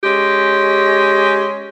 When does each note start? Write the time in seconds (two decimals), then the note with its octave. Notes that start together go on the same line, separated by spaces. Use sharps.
0.04 G#3 C#4 G4